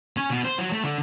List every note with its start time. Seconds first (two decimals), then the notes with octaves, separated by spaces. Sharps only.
0.17 C#4
0.30 B2
0.45 C5
0.58 F#3
0.72 A3
0.84 D3